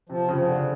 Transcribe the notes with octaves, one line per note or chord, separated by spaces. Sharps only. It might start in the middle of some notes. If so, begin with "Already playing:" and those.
C3 F3
C#3
F3
D3